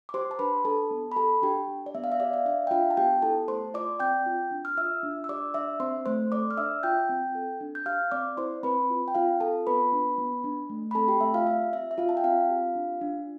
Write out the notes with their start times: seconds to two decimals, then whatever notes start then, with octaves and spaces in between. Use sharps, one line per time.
0.09 D6
0.14 G4 C5 C6
0.31 A5
0.39 D4 B4 B5
0.65 D4 A4 A5
0.91 B3
1.12 B5
1.16 G4 A4 A5
1.42 D4 G4 G5
1.68 D4
1.86 D5
1.95 B3 E5
2.04 F5
2.12 E5
2.20 G4 D5
2.33 F5
2.45 D4 E5
2.67 G5
2.71 D4 F4 F5
2.91 A5
2.97 B3 G4 G5
3.22 E4 A4 A5
3.48 A3 C5 C6
3.74 F4 D5 D6
4.00 C4 G5 G6
4.26 F4
4.51 D4
4.65 F6
4.77 F4 E5 E6
5.03 D4
5.24 E6
5.29 G4 D5 D6
5.54 D4 E5 E6
5.80 C4 C5 C6
6.05 A3 C5 C6
6.31 A4 D5 D6
6.50 F6
6.57 D4 E5 E6
6.83 F4 G5 G6
7.09 C4
7.35 A4
7.61 D4
7.75 G6
7.86 G4 F5 F6
8.11 C4 D5 D6
8.37 E4 C5 C6
8.63 C4 B4 B5
8.90 F4
9.08 G5
9.15 C4 F4 F5
9.40 F4 A4 A5
9.67 B3 B4 B5
9.92 D4
10.18 B3
10.44 D4
10.70 A3
10.91 B5
10.95 C4 A4 A5
11.08 G4 G5
11.21 A3 E5
11.34 F4 F5
11.47 G4 E5
11.73 C4 E5
11.91 E5
11.98 F4 F5
12.09 A5
12.17 G5
12.24 C4 F4 F5
12.50 G4
12.76 D4
13.01 D4